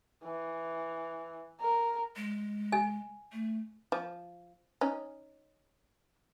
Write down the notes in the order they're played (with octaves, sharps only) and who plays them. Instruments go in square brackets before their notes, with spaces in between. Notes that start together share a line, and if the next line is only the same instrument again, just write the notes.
[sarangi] E3
A#4
[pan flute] G#3
[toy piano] G#5
[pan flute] A3
[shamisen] F3
C#4 D#4